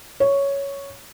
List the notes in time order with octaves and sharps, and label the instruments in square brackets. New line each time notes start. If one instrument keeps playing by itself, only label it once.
[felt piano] C#5